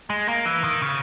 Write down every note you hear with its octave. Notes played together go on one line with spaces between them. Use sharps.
G#3
A#3
E3
D#3
C#3